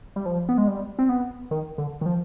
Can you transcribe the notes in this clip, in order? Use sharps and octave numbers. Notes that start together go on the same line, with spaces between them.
G3
F3
B3
G#3
G3
C4
B3
D#3
D3
D#3
F3